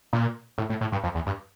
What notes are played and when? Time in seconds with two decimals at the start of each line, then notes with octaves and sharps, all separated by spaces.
0.13 A#2
0.58 A2
0.70 A2
0.81 A2
0.92 G2
1.04 F2
1.15 E2
1.26 G2